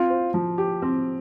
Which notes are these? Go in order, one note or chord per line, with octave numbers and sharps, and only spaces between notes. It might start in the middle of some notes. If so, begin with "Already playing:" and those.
Already playing: C4 F4
C5
F3
G4
C4